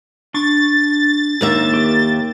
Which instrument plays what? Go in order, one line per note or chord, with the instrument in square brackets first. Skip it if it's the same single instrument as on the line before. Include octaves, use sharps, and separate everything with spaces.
[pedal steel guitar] D4 C#6 [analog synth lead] A6
[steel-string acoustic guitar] D#2 A#3 E5
[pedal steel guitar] G4